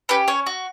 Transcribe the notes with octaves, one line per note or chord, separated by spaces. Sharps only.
C#4 G4 B4
C#4 C#5
F#4